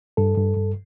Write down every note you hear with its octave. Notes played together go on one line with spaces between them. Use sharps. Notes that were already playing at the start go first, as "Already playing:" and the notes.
G2 A4
G2
G2